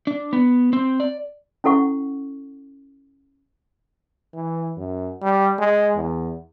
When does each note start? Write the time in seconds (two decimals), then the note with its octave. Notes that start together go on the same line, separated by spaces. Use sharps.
0.07 D4
0.33 B3
0.73 C4
1.00 D5
1.64 C#4 E4 A4 F#5 C#6
4.34 E3
4.77 F#2
5.22 G3
5.58 G#3
5.96 E2